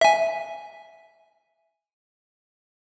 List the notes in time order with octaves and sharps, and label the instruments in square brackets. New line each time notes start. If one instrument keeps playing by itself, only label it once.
[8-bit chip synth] E5 G#5